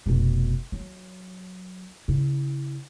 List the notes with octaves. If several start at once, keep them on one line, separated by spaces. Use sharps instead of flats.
F1 B2
F#3
C#3 E4